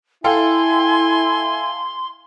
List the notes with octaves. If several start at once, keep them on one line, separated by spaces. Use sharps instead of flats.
E4 A4 F5 G5 G#5 C6